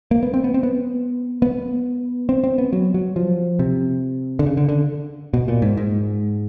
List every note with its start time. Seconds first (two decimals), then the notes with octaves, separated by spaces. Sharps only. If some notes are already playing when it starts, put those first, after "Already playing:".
0.11 A#3
0.23 B3
0.34 C4
0.44 B3
0.54 C4
0.63 B3
1.42 B3
2.29 C4
2.44 C4
2.58 B3
2.73 F#3
2.94 F#3
3.16 F3
3.59 C3
4.39 D3
4.46 C#3
4.57 D3
4.69 D3
5.34 B2
5.48 A#2
5.62 G#2
5.77 G#2